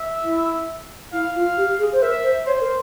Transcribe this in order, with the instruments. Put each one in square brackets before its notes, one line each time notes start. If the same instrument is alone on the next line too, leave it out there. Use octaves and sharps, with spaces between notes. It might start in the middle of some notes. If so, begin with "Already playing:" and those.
Already playing: [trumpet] E5
[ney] E4
[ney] E4 [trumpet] F5
[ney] F4
G4
G#4
C5
[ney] A#4 [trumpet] E5
[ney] C5
[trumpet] C5 [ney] C#5
[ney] A#4